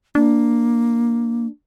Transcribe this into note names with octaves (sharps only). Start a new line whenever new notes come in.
A#3 D4